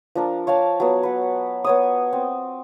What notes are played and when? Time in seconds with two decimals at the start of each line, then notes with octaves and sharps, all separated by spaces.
0.15 F3 D4 A#4
0.47 C#5 F5 G5 A5
0.80 F#3 B3
1.03 B4 F#5
1.64 B3 C#5 D#6
2.13 C4